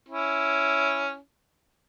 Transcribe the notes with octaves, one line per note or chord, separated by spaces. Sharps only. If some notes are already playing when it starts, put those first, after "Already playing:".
C#4 E4